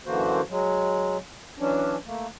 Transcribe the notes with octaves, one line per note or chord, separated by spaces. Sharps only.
F#2 D3 E3 A#3 F#4 C5
F#3 G#3
E3 F#3 C#4 D4
A3 A#3